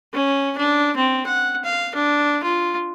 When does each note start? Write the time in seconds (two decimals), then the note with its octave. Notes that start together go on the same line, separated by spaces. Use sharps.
0.14 C#4
0.57 D4
0.96 C4
1.26 F#5
1.64 F5
1.95 D4
2.43 F4